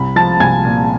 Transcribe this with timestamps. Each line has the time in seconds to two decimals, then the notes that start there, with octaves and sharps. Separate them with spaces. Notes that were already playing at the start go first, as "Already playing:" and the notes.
Already playing: C2 B5
0.16 F3 A5 A6
0.40 C2 G#5 G#6
0.65 A#2